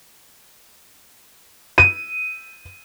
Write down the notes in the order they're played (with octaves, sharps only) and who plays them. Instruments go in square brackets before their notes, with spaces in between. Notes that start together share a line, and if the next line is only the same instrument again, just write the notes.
[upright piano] D#7